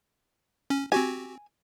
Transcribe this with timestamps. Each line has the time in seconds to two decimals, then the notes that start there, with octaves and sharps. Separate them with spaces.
0.70 C#4
0.92 C4 F#4 G4 G#5